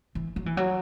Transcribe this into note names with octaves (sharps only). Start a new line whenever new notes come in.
E3
F#3
E3
F#3